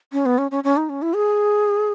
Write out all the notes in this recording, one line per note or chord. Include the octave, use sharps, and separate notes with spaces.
C#4
B3
C#4
C#4
C#4
D#4
C#4
E4
G#4